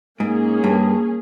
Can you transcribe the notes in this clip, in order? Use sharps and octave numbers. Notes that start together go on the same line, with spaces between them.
G#2 A#3 C#4 G#4
G2